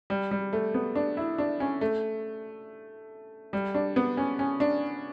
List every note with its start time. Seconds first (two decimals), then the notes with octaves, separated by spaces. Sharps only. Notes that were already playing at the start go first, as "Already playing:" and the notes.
0.10 G3
0.31 G3
0.53 A3
0.74 B3
0.95 D4
1.17 E4
1.38 D4
1.60 C#4
1.81 A3
3.53 G3
3.74 D4
3.96 B3
4.17 C#4
4.39 C#4
4.60 D4